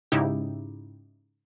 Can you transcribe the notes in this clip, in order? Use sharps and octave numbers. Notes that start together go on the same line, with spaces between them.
G#2 C#3 D#4 E4 G4